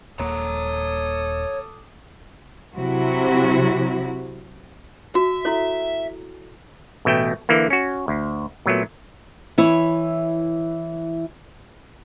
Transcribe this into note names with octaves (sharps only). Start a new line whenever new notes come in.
D#1 A#3 A4 C#5 A#5 D6 D#6
C3 F#3 E4 F#4
F#4 E5
E4 A4 C#5
A1 B2 A3 G5
D3 E3 A#3
C#4 F#4
D2
A#2 F#3 A3 B3
E3 E4 C#5